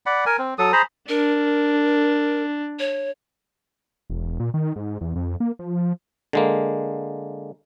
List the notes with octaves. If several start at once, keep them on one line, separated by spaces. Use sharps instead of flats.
D5 F#5 B5
A#4 G#5
C4
F#3 A4 D#6
G#4 C5 A#5 B5
D4 A#4
C#5
E1
A#2
D#3
G#2
E2
F2
A#3
F3
D3 G#3 A#3